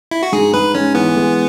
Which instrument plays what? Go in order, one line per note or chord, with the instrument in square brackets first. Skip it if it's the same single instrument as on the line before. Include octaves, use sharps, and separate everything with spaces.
[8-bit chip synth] E4
F#4
[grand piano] G#2 [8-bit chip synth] G#4
[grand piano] G#2 [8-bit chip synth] B4
[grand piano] G#3 [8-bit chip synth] C#4
[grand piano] E3 [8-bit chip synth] B3
[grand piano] G#3